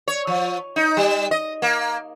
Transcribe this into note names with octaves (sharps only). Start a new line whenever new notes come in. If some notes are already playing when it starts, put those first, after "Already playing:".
C#5
F3
D#4
G3
D#5
A#3